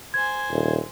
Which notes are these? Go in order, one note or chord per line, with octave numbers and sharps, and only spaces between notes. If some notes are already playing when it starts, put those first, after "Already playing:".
C5 G#5 G#6
D#1